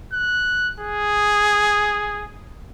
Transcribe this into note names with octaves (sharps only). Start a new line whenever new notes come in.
F#6
G#4